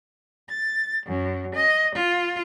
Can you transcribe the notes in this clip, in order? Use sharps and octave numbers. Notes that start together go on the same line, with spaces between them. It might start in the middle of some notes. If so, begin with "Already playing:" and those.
A6
F#2
D#5
F4